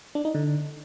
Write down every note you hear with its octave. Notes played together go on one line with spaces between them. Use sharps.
D4
D#4
D3